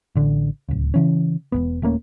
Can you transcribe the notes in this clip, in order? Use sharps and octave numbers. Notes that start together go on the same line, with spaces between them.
A1 D3
D1 C#2
C#3 E3 C#4
E1 C#2 B3
D#1 A3 A#3 C#4